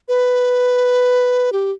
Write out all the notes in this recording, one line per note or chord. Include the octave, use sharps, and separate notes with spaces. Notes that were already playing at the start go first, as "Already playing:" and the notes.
B4
G4